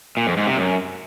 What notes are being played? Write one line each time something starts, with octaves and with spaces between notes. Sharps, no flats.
A#2
F2
G#2
C3
F#2